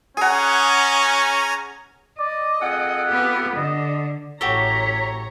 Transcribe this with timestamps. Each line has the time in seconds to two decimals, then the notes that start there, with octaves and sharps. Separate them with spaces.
0.17 C#4 G#4 F#5 G#5 A#5
2.19 D5 D#5
2.61 F2 G#4 A4 F#5
3.09 B3 G4
3.56 D3 D#5
4.41 A1 A2 F#4 G4 A4 C#5 A#5 B6